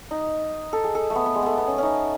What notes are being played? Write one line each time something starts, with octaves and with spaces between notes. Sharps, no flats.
D#4
A4
G#4
A4
A3
B3
B3
G#3
A3 B3
B3
C#4
C#4 D#4